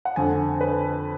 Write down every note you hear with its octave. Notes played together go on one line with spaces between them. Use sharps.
F#5
F2 D3 G#5
B4